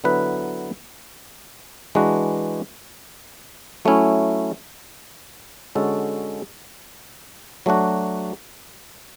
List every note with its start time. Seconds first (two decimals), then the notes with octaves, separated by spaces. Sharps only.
0.04 D3 F#3 B3 E4 B4
1.95 E3 G#3 D4 F#4 B4
3.85 F#3 A3 C#4 E4
5.75 D3 G#3 C#4 F#4 A4
7.66 F#3 A3 D4 F#4